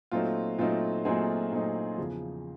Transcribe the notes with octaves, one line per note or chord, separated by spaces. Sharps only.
A#2 F#3 A3 C4 D#4 F4
A#2 F#3 A3 C4 D#4 F4
A#2 F#3 A3 C4 D#4 G#4
A#2 F#3 A3 C4 D#4
E2 C#3 F3